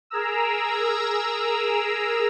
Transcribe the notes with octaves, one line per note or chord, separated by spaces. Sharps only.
G#4 A#4 A#5 E6